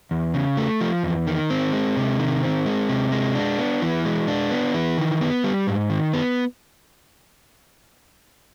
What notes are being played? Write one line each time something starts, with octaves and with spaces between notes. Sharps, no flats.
E2
C#3
A3
F3
E2
D#3
C4
G#3
C3
D#3
C4
G#3
C3
G#3
D4
B3
E3
G#3
D4
B3
E3
D#3
B3
G3
G#2
D#3
B3